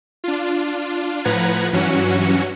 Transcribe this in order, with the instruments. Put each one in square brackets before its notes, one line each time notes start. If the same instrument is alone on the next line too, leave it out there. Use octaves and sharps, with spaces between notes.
[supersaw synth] D4 F4
A2 F3 B4 F#5 A#5 G#6
G2 E3 F#3 C#4 F#4 C#7